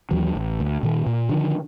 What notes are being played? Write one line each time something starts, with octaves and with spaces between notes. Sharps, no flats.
D#2 E3 F#3
A1
D2
A#2 D#3
A#2
D3 D#3 F3